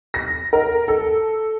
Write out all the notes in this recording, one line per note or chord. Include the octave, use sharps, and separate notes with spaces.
A#6
A#4
A4